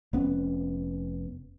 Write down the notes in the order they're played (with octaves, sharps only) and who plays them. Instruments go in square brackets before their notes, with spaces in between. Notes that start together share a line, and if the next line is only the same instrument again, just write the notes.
[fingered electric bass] F1 B3 C#4